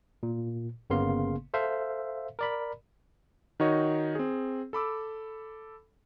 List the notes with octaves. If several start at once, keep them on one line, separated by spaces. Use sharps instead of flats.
A#2
G1 C#3 A#3 B3 F5 C6
A4 C5 E5 F5
A#4 D5 B5
D#3 D#4 F#4 C#5 D#5
C4 G#4
A4 B5 D6 E6